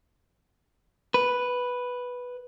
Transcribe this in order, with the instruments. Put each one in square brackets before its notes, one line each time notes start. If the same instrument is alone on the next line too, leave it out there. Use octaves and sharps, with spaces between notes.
[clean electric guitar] B4